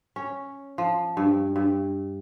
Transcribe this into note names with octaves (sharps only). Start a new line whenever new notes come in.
C#4
F3
G2
G2